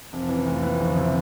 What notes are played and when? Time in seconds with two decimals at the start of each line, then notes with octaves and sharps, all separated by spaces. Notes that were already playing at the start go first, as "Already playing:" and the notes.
0.13 F1 C4
0.24 C4
0.29 E3
0.35 C#4
0.46 F1 A3
0.63 E3 A#3
0.79 F1 B3
0.87 D3 D4
0.96 C3 C#4
1.05 C4